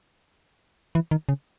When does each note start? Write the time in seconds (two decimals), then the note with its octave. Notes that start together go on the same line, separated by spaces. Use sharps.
0.95 E3
1.11 D#3
1.29 C#3